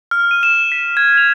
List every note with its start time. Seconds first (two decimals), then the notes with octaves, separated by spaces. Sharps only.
0.11 F6
0.31 D#7
0.43 E7
0.72 B6
0.97 G#6
1.17 F7